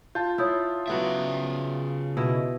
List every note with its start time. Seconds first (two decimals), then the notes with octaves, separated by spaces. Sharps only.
0.15 F4 A5 G6
0.38 E4 C#5 D#6 G6
0.88 C#3 F#3 B3 E4 E5
2.17 B2 E4 D#5